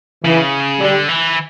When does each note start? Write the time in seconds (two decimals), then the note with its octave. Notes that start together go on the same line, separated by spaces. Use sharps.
0.24 C#3 E3
0.80 D3 G3
1.09 E3